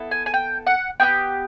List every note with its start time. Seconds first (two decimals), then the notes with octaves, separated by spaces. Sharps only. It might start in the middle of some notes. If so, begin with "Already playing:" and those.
Already playing: B3 E4 A4
0.11 G#5
0.26 G#5
0.34 G5
0.67 F#5
1.00 B3 D#4 G4 G5